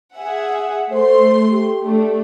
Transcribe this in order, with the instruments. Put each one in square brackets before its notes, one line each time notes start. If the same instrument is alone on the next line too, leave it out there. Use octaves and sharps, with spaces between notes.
[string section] G#4 E5 F#5
[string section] A3 C6 [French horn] C5
[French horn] G4
[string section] A3 D4